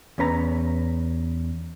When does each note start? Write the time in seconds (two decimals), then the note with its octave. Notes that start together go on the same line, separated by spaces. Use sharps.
0.18 E2 C#4 B4 A#5